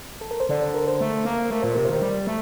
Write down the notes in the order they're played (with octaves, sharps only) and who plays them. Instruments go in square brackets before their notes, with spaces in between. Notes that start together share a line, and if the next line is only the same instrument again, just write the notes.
[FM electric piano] A4
A#4
C5
[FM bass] D3 [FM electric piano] D5
[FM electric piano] C5
A#4
C5
[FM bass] A3
A#3
[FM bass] A3 [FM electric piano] A#4
[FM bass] A#2 [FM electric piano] C5
[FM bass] C3 [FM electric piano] A#4
[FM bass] D#3 [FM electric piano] C5
[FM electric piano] A#4
[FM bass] G3
A3